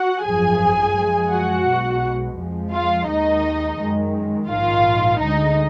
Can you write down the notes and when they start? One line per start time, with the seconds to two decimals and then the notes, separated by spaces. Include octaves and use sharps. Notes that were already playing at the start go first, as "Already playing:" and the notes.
Already playing: F#4 F#5
0.24 G#1 F#2 F3 G#4 G#5
0.95 F#2 F3 G#3
1.30 F#4 F#5
1.66 B1 B2 G#3
2.37 F2 F3 G#3
2.72 F4 F5
3.08 D#2 D#3 G#3 D#4 D#5
3.79 F#2 D#3 G#3
4.49 A#1 G#2 D#3 F4 F5
5.20 D2 D3 G#3 D#4 D#5